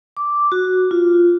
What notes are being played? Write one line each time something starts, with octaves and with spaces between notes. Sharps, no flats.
D6
F#4
F4